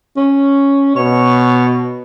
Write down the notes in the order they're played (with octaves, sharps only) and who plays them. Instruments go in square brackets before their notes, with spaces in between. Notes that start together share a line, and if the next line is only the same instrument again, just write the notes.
[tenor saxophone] C#4
[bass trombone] B2 [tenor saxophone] C#5